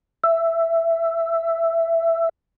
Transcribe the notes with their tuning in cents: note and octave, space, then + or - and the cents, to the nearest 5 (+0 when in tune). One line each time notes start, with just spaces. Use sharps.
E5 +10